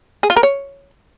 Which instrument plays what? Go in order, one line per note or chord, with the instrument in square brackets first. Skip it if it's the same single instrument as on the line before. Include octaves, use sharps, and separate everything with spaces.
[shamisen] G#4
F4
A#4
C#5